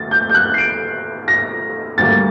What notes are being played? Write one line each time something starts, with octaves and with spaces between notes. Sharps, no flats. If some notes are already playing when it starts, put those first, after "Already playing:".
Already playing: D2 A6
G6
G6
F#6
C7
D7
A#6
D2 D3 G3 A#3 A6